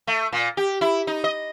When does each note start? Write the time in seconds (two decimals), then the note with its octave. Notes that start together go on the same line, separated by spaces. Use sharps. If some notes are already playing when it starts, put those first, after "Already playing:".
0.07 A3
0.33 A#2
0.57 G4
0.81 E4
1.07 D#4
1.24 D#5